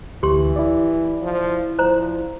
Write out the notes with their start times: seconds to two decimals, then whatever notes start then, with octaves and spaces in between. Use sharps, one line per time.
0.23 D2 E3 G4 C6
0.56 E4 D5
1.22 F3
1.79 F3 C5 A#5